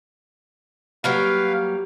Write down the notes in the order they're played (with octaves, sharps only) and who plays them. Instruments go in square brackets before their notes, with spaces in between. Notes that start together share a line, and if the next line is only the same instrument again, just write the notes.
[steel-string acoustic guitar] F#3 G3 A#3 [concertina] B4 F5